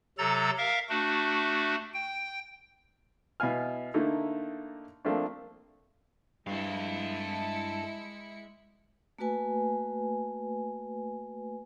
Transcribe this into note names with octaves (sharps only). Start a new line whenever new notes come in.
C3 F#3 A4 A#5 A6
A#4 E5 F5
A3 D4 F#4
G5
B2 E4 F5 G#5 F6
D3 A3 A#3 D#4 E4
F3 A3 A#3 C4 D4
G2 G#3 E4 A4 F5 C#7
A3 A#3 F#4 B4 G#5